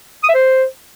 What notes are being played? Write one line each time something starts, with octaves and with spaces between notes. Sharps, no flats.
D#6
E5
C5